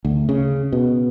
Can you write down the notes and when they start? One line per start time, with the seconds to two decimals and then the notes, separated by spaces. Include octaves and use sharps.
0.05 D2
0.29 C#3
0.73 B2